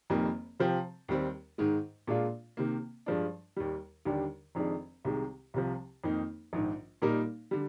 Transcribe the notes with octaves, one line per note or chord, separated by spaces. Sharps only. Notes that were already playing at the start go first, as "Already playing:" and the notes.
F1 F2 D#3 G3 A#3
C3 F3 C4 G4
D#2 D#3 G3 C4
G#2 D#3 G#3
A#2 G#3 D4 F4
C3 D#3 A#3
G2 F3 G#3 D4
D#2 D#3 G3
D#2 D3 G3 D4 G4
F1 F2 D#3 G#3 D4
C2 C3 D#3 G#3
C2 C3 F3
F2 D#3 A#3 D#4
A#1 G#2 D#3
A#2 G3 A#3 D#4 A#4
D3 G3